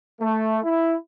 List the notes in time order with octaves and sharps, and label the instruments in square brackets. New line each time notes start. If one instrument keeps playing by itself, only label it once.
[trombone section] A3
E4